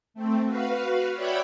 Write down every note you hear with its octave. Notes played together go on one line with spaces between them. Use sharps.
A3 C4
F#4 B4 F5
C#5 D5 E5 F#5 G5 B5